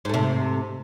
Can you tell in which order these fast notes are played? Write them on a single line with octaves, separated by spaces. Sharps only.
G#2 A3 C3